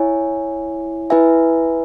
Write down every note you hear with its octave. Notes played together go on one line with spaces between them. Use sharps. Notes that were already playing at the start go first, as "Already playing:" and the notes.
Already playing: E4 C#5 E5 G#5
E4 B4 E5 G#5